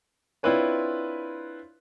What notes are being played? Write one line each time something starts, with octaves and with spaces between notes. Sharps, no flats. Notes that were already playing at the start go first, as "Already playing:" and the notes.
C4 D4 E4 F4 B4 C#5